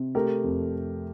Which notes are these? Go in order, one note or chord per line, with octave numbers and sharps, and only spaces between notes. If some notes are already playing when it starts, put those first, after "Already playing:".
Already playing: C3
A3 G4 A#4
F2